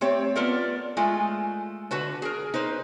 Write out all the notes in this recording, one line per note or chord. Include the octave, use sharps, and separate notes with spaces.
A3 C4 G4 C#5
B3 F4 A4 A#4 D5
G#3 A3 F4
D3 F#4 B4 A5
G#4 A#4
D#4 B4 C5